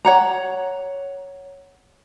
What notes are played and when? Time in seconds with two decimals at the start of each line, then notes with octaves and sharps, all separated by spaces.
0.05 C#5 F#5 A#5